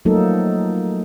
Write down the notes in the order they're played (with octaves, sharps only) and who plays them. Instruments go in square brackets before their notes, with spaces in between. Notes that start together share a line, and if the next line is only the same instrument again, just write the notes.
[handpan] F3 F#3 A3 A#3 D#4 A4